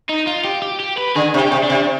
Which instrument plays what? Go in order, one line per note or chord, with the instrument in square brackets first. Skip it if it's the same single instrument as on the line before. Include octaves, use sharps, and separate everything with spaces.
[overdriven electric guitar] D#4
F4
G4
G4
G4
B4
[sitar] D3 [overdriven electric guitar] G#4
[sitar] C3
[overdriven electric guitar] G4
[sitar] C3
[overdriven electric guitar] D4
[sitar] C3